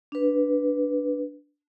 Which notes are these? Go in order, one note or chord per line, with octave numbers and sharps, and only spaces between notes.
D4 B4